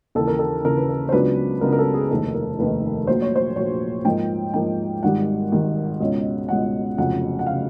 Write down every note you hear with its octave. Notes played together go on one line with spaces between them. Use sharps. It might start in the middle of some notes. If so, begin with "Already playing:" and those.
D#2 C#3 E3 A4
A#4
A4
D#2 C#3 E3 A#4
B4
A#4
C5
C#2 C#3 F#3 B3 D4 B4
C#2 C#3 F#3 B3 D4 A#4
A#4
A4
G#4
F1 D#2 D#3 A4
A#4
F1 D#2 D#3 B4
A#1 A#2 F#3 C5
C#5
C5
A#1 A#2 F#3 C#5
G#2 F3 A#3 G5
G#2 F3 A#3 G5
G#1 G#2 D#3 G3 F#5
G#1 G#2 D#3 G3
C#2 B2 G#3 C#4
C#2 B2 G#3 C#4 F#5
F1 F2 C#3 F#3 F#5
F#5
C#3 F#3 F5